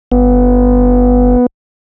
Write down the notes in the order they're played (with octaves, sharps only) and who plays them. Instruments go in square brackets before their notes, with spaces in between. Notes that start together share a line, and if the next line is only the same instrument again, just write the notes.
[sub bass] G1 [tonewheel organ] B3